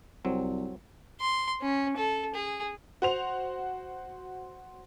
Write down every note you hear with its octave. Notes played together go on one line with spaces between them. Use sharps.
C2 F#3 C4
C6
C#4
A4
G#4
F#4 C5 F7